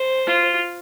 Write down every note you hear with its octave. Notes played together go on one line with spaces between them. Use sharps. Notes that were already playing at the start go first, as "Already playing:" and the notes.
Already playing: C5
F4